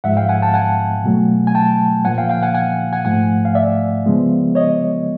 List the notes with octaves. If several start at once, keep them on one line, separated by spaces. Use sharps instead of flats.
G#2 F3 G#3 E5 F#5
F5 G5
F#5 G#5
G5 A5
F#5 G#5
B2 F#3 A3
G#5
G5 A5
A#2 F3 A#3 F#5 G#5
F5 G5
F5 G5
F#5 G#5
F#5 G#5
F#5 G#5
G#2 F3 A3 F#5 G#5
F5
D5 E5
C#3 F3 G#3 B3
C#5 D#5